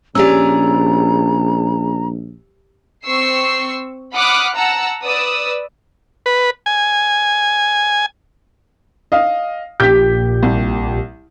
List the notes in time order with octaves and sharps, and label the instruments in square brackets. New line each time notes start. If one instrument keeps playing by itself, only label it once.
[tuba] A#1 [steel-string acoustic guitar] C#4 G#4 D5 [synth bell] G4 E6 [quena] A#5
[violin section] C4 C#6 E6 C7
F#5 B5 D6 D#6 F6 F#6
F#5 A5 A#5 E6
B4 D5 D#6 E6
[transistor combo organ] B4
G#5
[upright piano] D#5 F5
[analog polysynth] A#1 A#2 G4 [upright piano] G6 B6
[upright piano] C2